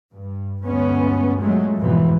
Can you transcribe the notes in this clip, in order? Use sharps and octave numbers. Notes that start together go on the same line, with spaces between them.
G2
D2 G2 G#3 B3 C#4
A#2 F#3 G#3 A3
F2 G#2 B2 E3